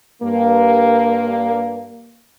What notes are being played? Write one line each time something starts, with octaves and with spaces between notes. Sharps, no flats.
G2 A#3